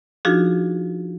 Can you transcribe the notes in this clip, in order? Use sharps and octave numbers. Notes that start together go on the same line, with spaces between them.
F3 D4 D#4 F4 F#4 G#4